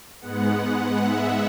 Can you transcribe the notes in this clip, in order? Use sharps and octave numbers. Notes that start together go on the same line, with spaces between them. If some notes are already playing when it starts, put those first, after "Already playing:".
G#2 G#3 B3 F#5
E5